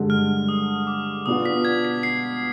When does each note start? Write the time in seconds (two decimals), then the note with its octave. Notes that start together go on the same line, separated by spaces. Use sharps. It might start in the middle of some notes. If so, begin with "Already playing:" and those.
Already playing: G2 D3 G#3
0.10 F6
0.49 D#6
0.87 D6
1.26 B2 B3 D4 F4 D#6
1.45 B6
1.65 G#6
1.85 B6
2.03 C7